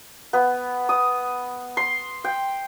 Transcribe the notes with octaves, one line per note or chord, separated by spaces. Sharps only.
B3
D#6
C6
G5